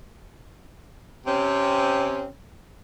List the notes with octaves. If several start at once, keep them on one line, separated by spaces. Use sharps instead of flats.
C3 C4 C#4